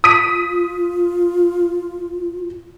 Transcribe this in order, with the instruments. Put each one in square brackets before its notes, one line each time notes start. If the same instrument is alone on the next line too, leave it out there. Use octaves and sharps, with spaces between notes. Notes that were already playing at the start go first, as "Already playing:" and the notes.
[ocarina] F4 [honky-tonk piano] D#6 B6 D#7